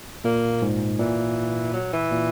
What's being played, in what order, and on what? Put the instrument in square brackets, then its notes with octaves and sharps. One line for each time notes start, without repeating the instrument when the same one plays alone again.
[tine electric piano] A#2 [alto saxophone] A#3
[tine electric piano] G#2
[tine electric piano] A#2 [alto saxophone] E3
[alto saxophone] F#3
E3
[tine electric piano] A#2